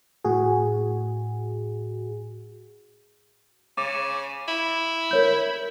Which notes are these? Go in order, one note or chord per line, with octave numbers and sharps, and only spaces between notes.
A2 F#4 G#4
C#3 D6
E4
A#4 C#5 G6